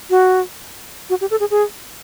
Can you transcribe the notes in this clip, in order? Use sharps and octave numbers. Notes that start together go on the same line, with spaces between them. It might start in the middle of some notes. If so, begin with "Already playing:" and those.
F#4
F#4
G4
A4
G#4
G#4